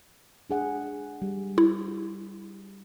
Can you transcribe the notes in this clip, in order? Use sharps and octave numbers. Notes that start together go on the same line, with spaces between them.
D4 G#4 F#5
G3
E4